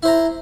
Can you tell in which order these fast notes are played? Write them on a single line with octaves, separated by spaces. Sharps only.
E4 C5 A#5